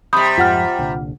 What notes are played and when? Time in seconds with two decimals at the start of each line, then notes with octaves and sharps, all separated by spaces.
0.13 C3 G3 B5 D#6 G6
0.37 F2 G#2 F3 F4 F#5 F6
0.78 C2 A#2 D3